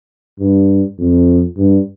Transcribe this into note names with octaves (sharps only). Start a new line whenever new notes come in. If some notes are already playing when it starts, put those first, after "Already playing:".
G2
F2
G2